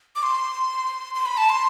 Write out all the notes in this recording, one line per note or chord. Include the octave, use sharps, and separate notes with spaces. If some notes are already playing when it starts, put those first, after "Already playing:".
D6
C6
C6
B5
A5
C6